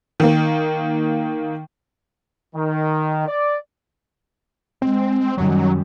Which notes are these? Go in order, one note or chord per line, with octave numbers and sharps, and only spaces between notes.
D#3 A#3
D#3
D5
G#3 C4
F#2 D#3 F#3 G3